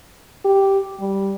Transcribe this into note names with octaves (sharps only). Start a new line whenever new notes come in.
G4
G3